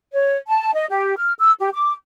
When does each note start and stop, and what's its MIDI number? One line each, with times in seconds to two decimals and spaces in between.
0.14 0.37 73
0.49 0.74 81
0.74 0.85 75
0.90 1.15 67
1.17 1.33 89
1.40 1.52 88
1.60 1.70 67
1.74 1.93 86